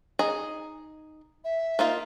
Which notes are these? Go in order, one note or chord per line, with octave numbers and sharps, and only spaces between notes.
D#4 G#4 D#5
E5
A#3 D#4 F4